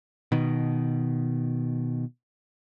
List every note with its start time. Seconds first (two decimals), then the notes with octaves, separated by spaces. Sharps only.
0.32 B2 D#3